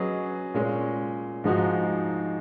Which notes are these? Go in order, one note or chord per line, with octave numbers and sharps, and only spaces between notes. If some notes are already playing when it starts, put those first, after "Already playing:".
Already playing: F#3 C#4 G#4 B4 D#5
A#2 G#3 C#4
G#2 F3 G#3 D#4 F#4